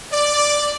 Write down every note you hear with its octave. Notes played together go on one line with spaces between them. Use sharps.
D5